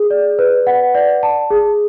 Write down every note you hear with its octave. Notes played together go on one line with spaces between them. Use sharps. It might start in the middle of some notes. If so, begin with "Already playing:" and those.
Already playing: G#4
D5
B4
F#5
D5
A5
G#4